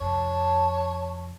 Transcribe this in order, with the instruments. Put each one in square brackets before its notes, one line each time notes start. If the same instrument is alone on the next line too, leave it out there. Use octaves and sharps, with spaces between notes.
[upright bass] F2 C3 [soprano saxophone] C#5 [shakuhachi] A5